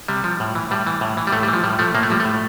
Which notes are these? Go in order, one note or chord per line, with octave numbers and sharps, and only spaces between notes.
C3 G3
F3
A2
E3
A2 G3
E3
A2
E3
G3
A2 A3
G3
E3
F3
A2 G3
F3 A3
A2 A#3
A3
F3 G3
A3
A2